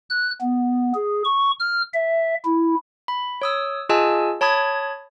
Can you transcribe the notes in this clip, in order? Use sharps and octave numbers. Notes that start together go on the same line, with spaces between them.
F#6
B3
G#4
C#6
F6
E5
E4
B5
C#5 D#6 E6
F4 G#4 D#5 G#5 A5 E6
C#5 A5 B5 D#6 G#6